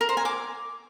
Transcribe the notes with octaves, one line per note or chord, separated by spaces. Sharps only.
A#4
C5
G#5
D6